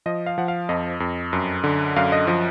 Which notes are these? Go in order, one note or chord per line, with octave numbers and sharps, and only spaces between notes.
F3 D#5
F5
F3 F#5
F5
F2 D#5
F2
F#2
D3
F#2 F5
D#5
F3 D#5